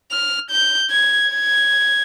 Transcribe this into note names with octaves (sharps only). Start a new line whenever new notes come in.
F6
G6
G#6
G#6